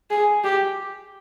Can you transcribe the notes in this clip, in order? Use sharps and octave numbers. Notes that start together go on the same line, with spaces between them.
G#4
G4